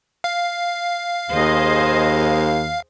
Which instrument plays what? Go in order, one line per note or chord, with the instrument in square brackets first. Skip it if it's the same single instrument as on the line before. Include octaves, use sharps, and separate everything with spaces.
[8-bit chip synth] F5
[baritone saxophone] D#2 [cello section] G#4 C5 D#5